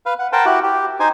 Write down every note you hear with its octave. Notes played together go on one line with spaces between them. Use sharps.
B4 F5
F#5
A#4 C5 F#5 G5 A5
E4 F#4 G4 F#5
G4
D#4 C5 G#5